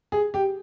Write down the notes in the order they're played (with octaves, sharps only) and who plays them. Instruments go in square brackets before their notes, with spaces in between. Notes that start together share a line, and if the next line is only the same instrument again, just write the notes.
[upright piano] G#4
G4